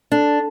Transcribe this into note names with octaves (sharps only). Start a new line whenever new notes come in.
D4 A4